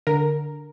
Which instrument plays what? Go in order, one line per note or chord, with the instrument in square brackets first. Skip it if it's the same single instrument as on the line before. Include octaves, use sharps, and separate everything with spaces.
[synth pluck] D3 A#4